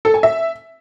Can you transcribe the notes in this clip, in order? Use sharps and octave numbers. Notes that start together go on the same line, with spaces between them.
A4
G#5
E5